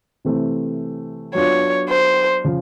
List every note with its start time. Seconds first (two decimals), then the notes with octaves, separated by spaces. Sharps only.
0.25 C3 E3 A3 C4
1.35 F#3 B3 D4 F4 C#5
1.89 C5
2.44 C#3 F3